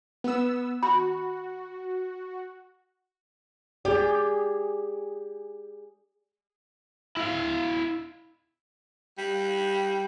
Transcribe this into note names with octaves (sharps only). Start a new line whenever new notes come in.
B3 E6
F#4 B5
G4 G#4 D5
E4 F5
G3